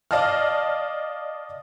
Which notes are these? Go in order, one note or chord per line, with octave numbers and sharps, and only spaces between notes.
D5 D#5 F5 A5 F6